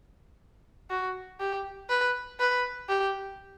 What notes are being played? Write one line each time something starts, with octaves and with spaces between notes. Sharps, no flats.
F#4
G4
B4
B4
G4